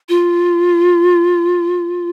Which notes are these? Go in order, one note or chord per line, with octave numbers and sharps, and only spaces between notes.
F4